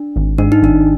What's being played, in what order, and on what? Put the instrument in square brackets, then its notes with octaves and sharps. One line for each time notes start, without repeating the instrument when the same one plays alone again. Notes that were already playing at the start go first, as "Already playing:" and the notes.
Already playing: [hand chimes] D4
[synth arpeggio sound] G#1
[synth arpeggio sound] G#2 [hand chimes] D4
[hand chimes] D#4
[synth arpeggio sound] G#1 [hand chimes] D4